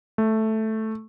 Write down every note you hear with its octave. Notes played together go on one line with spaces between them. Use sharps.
A3